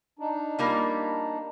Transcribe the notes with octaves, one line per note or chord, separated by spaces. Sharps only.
D4 D#4
G3 A#3 F4